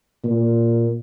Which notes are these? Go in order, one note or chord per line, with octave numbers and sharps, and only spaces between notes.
A#2